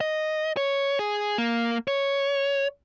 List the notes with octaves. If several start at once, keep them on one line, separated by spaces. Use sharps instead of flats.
D#5
C#5
G#4
A#3
C#5